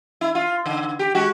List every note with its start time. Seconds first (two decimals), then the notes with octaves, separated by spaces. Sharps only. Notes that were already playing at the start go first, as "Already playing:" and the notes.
0.21 E4
0.35 F4
0.66 D3
0.99 G4
1.15 G#3 F#4 G4